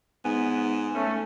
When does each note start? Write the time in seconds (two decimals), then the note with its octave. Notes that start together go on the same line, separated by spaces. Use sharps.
0.24 G#2 B3 G#5
0.95 A3 C#4